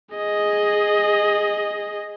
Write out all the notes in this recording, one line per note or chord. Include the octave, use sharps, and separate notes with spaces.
G#4 D#5